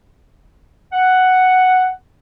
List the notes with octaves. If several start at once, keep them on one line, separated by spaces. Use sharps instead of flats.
F#5